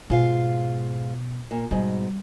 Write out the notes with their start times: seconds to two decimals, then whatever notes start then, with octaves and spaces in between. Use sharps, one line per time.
0.10 G#2 B2 F4 F5
1.51 A#2
1.71 G#2 B2 G3